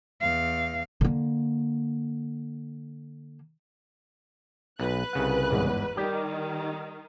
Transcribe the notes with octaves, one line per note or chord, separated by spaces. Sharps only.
E2 F5
D3 A#3
B1 B4 F#6
C2 C#3 F#5
G1 E2 G#2
D#3 G3 G4